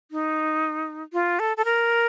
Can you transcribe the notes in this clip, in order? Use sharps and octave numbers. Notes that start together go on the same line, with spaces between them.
D#4
F4
A4
A4
A#4